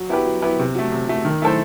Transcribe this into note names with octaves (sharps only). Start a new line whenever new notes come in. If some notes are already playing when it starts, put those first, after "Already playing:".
Already playing: F#3
B3 E4 G4 B4
F#3
B3 E4 G4 B4
C3
F#3 A3
C3
F#3 A3
D#3
A3 E4 A4 C5